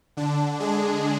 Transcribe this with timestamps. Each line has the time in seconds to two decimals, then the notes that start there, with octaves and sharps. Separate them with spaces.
0.17 D3 D4
0.60 G#3 G#4